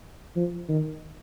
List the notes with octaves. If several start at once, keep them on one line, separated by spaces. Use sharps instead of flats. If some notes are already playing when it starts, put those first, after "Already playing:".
F3
D#3